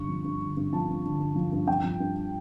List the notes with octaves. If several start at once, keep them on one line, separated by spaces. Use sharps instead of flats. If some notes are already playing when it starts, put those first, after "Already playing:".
Already playing: G2 D3 C#6
F3
G2
D3
G2
F3 A5
G2
D3
G2
F3
G2
F3 G5
F3
G2